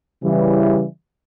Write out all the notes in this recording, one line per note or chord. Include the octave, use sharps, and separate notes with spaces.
C#3 E3 G3